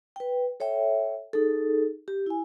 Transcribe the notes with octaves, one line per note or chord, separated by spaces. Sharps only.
B4 G5
A4 C#5 E5 G5
D#4 G#4 A4
G4
E4 G#5